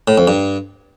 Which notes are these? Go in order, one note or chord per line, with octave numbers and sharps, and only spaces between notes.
A2
F2
G2